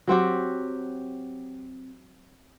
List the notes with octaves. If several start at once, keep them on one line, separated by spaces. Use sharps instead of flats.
F#3 C4 F#4 G4